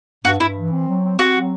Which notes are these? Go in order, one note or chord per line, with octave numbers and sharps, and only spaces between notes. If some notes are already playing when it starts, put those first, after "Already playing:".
G2 F#4
G2 E4
E3
C4
F#3
C4
C4 F#4
F#3